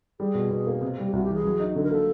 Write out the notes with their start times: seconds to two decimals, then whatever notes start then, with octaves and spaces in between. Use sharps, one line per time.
0.20 G3 G#4
0.35 B2
0.51 B2
0.67 A#3
0.81 C3
0.98 G3
1.07 G4
1.13 C2 F#4
1.24 G4
1.29 E3
1.34 G#4
1.45 F#3
1.60 D#4
1.75 D3 A4
1.84 A#4
1.92 A#3 A4